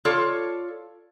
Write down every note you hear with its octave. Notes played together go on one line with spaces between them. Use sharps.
F4 A4 C#5 D5